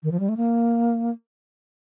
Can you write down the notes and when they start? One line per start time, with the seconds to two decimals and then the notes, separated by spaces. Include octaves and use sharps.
0.03 D#3
0.11 F3
0.20 G3
0.29 A3
0.37 A#3